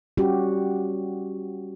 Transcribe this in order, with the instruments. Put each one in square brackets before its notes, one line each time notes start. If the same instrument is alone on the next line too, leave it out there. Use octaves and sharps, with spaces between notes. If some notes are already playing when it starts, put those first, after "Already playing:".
[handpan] G3 C#4 F#4 G4